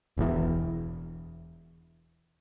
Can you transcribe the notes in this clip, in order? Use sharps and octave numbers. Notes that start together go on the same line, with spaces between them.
E1 E2